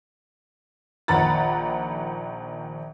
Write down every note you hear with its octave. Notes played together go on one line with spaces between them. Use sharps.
A#1 D#3 F#5 A#5 B5 A6